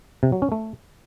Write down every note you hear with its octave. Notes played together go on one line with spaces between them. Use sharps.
C3
F#3
C#4
A3